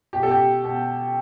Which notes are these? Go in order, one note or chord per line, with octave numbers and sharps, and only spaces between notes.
B2 G4
A4
G4
B2